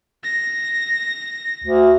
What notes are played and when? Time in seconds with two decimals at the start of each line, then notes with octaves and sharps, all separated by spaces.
0.23 A#6
1.64 D2